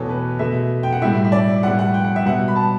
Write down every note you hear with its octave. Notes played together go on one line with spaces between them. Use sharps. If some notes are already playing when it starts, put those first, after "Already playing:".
Already playing: E2 B2 A3 A4 C#5
B4
B2 A3 E5
G5
F#5
A2 G3 E5
E5
D5
A2 G3 F#5
F#5
G5
F#5
E5
B2 G3 F#5
B5
A5